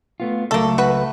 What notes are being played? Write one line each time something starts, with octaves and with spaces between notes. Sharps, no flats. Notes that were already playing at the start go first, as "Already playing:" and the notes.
A3 B3 F4
C#2 F#3 A3 A#3 A4
F#4 B4